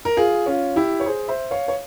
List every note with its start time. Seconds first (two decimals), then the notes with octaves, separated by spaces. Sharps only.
0.05 A#4
0.17 F4 G#4
0.46 C#4 F4
0.76 E4 G4
1.00 C#5
1.06 G#4 C5
1.28 C5 E5
1.51 C#5 F5
1.68 C#5